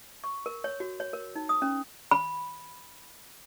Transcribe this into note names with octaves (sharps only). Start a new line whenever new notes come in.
C#6
A#4
C#5
F#4
C#5
A#4
D#4
D#6
C#4
B5